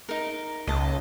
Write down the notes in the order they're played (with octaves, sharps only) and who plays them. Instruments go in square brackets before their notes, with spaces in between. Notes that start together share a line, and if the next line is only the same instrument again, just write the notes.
[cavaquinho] D#4 A#4
[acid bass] C#2 [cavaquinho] D#5 A5